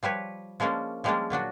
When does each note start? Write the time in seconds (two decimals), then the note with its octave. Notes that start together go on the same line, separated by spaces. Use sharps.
0.03 F3 G3 B4 C#5
0.60 F3 G#3 A#3 C#4 D4
1.04 F3 G3 G#3 A#3 C#4 D4
1.30 A#2 F#3 D4 F#4